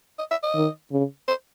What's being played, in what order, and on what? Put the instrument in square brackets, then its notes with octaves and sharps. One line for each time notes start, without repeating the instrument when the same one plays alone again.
[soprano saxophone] D#5
E5
D#5
[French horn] D#3
C#3
[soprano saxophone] C5